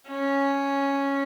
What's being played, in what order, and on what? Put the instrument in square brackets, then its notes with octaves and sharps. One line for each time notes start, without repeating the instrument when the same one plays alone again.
[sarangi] C#4